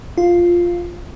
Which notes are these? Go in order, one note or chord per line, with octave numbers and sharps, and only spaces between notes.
F4